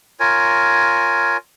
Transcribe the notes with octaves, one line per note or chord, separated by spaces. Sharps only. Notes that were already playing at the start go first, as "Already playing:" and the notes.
F4 A#4 C#5 G#5